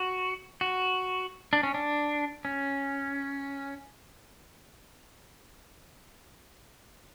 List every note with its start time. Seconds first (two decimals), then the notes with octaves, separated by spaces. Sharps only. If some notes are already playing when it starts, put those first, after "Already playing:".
Already playing: F#4
0.61 F#4
1.53 D4
1.63 C#4
1.74 D4
2.45 C#4